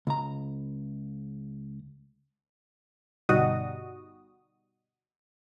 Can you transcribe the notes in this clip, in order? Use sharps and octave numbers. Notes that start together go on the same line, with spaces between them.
C#2 A#5
G1 B2 G3 D#4 F#4 D#6